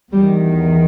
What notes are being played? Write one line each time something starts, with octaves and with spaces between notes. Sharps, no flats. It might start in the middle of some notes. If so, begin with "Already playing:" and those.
E2 D#3 G3